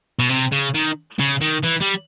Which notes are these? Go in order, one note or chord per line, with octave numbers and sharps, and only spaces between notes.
B2
C3
C#3
D#3
C#3
D#3
E3
G3